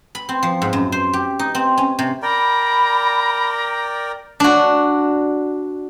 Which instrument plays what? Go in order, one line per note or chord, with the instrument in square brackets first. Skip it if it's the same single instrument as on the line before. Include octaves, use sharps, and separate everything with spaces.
[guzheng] B5
C4
F3
G#2
F#2
C5
G4
D#4
C4
C#4
C3
[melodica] A#4 D5 G5 [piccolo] A#5 [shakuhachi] B5
[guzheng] D4 F#4